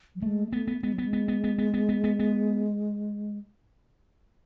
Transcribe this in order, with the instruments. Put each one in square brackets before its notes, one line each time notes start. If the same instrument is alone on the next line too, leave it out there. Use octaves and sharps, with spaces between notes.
[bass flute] F#3
[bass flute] G#3 [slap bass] A3
[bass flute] A3 [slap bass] B3
[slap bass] B3
[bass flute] G#3 [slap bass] B3
[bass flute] F#3 [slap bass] B3
[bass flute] G#3
[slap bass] B3
B3
B3
B3
B3
B3
B3
B3